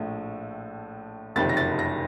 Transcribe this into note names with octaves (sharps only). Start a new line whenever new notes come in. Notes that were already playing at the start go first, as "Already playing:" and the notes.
Already playing: A#1 A2 A3
F#1 F2 C3 D#3 A6
A#6
A6
A#6